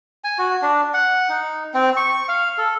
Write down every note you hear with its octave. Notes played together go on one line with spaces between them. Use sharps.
G#5
F#4
D4
F#5
D#4
C4
C#6
F5
A4